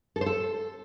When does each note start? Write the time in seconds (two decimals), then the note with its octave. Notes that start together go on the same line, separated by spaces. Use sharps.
0.16 A4
0.21 C5
0.26 A4